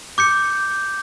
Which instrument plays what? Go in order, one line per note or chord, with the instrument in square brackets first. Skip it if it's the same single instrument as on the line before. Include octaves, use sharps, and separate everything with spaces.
[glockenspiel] D6 G6 C#7